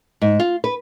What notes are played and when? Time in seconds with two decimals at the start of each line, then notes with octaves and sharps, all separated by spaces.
0.22 G#2
0.40 F4
0.64 B4